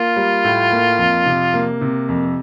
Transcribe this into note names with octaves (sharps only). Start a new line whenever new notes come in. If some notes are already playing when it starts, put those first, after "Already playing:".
Already playing: A#3 F4
G3
A2
A#3
F2
C3
A#3
C3
F2